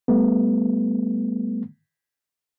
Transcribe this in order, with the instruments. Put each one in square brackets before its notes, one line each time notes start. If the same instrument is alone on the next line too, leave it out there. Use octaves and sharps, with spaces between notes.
[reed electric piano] G3 A3 B3